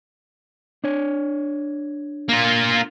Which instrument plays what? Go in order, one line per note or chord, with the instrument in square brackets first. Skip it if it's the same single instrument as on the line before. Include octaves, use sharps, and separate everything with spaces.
[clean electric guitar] D4 C#5
[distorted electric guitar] A#3 F4